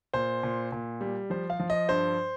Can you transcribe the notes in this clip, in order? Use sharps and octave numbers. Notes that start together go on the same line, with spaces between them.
A#2 C5
A#2
A#2
G3
F3 C5
F5
F3
D#5
G2 C5